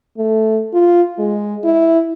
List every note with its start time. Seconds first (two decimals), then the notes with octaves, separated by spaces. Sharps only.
0.18 A3
0.74 F4
1.19 G#3
1.64 E4